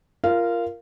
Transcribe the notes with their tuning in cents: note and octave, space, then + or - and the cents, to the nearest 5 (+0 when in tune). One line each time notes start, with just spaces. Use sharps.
F4 -20 A#4 +0 F5 -15